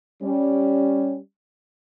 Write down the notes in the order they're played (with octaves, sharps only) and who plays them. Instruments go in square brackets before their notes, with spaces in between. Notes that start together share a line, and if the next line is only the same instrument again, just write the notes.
[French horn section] G3 C#4